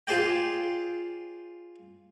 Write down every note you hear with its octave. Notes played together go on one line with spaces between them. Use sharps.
F4 G#4 C5 D5 G5